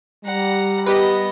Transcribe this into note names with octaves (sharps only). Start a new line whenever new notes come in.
G3 F#5 A#5
B3 G4 B4 D#5